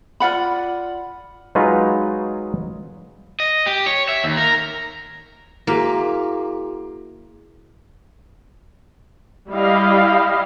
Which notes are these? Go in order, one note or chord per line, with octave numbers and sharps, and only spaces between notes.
F4 D5 F#5 B5
F#3 G#3 D#4 F4 B4 C#5
D#5
G4
C#5
E5
D#2
A#4
A#3 E4 F#4 G#4
G3 E4 D#5 F5